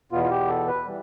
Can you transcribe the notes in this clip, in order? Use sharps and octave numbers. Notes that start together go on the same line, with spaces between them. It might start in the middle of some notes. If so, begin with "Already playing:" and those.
E2 B2 B3 F4
F4
G4
A4
B4
E3 G3